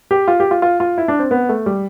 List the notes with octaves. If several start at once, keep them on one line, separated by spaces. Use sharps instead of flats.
G4
F4
G4
F4
F4
F4
E4
D4
C4
B3
A3
G3